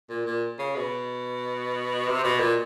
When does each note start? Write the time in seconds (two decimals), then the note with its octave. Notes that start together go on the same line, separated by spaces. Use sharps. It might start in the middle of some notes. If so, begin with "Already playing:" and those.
0.09 A#2
0.26 A#2
0.59 C#3
0.76 B2
2.08 C3
2.24 B2
2.40 A#2